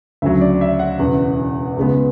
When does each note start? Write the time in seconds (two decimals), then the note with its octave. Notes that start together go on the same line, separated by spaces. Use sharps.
0.22 D2 C#3 F#3 E5
0.41 D5
0.61 E5
0.79 F#5
0.99 E1 E2 C#3
1.77 C#2 C#3 G#3 B3